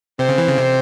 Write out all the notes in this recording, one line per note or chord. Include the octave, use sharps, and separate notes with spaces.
C3 C4
C#3
E3
C#3
C3